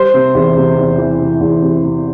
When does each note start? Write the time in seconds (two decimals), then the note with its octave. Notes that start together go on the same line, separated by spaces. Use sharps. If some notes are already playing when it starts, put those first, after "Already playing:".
Already playing: G3 C5
0.14 C3
0.35 E2
0.57 C3
0.78 E2
0.98 E3
1.20 C3
1.41 E2
1.62 C3
1.82 C3